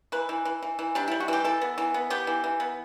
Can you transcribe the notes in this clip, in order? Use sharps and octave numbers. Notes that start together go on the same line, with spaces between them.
E3 B4
E3
E3
E3
E3
G3 D4
G3 E4
F#4
E3 G4
E3 A4
B3
E3
B3
B3 G4
E3
E3
B3